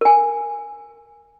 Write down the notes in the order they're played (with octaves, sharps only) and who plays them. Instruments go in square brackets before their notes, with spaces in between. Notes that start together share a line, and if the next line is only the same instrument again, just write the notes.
[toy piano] A#4 G#5